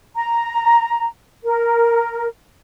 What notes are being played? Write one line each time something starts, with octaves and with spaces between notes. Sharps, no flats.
A#5
A#4